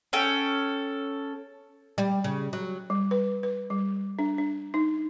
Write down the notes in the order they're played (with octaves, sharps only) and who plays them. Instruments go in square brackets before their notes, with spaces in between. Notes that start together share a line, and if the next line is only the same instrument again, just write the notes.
[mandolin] C#4 A4 G5
[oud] G3
C#3
F#3
[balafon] G3
B4
B4
G3
D4
D4
D#4